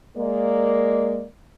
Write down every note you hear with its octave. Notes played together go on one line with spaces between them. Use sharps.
G#3 A#3 D5